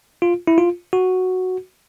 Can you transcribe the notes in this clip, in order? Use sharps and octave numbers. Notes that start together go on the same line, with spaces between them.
F4
E4
F4
F#4